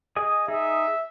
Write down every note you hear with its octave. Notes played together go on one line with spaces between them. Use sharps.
G#4 D#5 G#5
D#4 G#4 E5